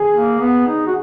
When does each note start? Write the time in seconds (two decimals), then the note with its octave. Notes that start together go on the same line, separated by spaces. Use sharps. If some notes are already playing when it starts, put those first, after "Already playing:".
Already playing: G#4
0.13 A#3
0.39 B3
0.67 D#4
0.87 F#4